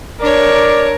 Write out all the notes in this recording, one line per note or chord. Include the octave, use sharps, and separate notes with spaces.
D4 A#4 C#5 D5